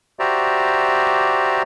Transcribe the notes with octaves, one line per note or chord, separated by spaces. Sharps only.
F#4 G4 C5 D5 E5 A#5